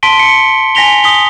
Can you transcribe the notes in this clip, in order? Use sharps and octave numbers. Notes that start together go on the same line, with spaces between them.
A5 C6 B6 D7 G7
C#7
G#5 A#6 B6 F7 G7
D#6 B6 G7